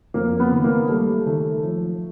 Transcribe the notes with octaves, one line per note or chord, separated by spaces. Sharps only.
F2 A#3
B3
D#3
A#3
G3 A3
D#3 A3
F3